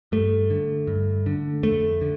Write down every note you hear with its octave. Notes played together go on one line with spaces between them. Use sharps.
G2 A3
D3
G2
D3
F2 A3
D3